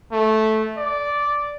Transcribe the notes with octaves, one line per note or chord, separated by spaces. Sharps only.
A3
D5